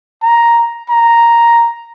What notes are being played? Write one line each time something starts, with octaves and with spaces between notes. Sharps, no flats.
A#5
A#5